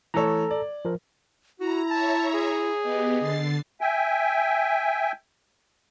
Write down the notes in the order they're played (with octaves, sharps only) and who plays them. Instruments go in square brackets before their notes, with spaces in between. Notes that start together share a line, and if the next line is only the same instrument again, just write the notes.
[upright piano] E3 A3 C#5 [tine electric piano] A4 A#5
[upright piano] D5
[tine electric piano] F3 A#4
[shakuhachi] E4 [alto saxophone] F#4 [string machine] A#5
[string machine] C#5 E5 A#5 [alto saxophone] A5
[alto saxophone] G#4
[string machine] B3 G4 [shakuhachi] D#5
[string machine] D3 A6 C7
[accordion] E5 G5 G#5